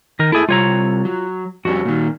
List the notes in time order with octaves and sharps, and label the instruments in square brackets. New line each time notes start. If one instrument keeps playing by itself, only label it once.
[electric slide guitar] D#3 A#4
[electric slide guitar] E4 G#4 [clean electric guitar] A4 E5
[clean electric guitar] C3 G3 [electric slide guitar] F4 C#5 A#5
[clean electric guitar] F#3
[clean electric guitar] F2 G3 C#4 [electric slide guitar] F#4
[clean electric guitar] A#2 D#3